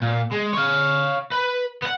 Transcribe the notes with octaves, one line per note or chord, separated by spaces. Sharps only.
A#2
G#3
C#5 F5
B4 B5
B3 F#5